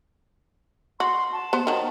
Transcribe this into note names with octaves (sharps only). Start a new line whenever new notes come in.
F#4 C6
A5
B3 C5
D#3 F#3